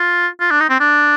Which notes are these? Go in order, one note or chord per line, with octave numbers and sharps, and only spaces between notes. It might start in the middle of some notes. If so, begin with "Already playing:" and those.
Already playing: F4
F4
D4
D#4
C4
D4